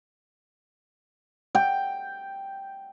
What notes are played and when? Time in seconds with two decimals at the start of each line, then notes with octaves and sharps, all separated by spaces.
1.55 G5